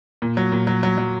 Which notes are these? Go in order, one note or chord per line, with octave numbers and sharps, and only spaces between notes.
A#2
F#3
A#2
F#3
F#3
F#3